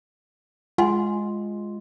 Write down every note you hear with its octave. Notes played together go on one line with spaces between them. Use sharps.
G#3 F4 F#5 G#5 C6